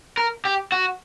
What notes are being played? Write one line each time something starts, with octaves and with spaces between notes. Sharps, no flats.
A#4
G4
F#4